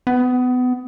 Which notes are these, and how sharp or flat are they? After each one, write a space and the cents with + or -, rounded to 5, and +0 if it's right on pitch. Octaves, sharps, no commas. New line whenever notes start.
B3 +25